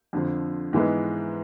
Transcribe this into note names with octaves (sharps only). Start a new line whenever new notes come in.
F2 D3 F3
G#2 E3 G#3 B3